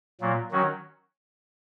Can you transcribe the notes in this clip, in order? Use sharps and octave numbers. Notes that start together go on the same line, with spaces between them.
A#2 F#3 A#3
D#3 F#3 C#4 F#4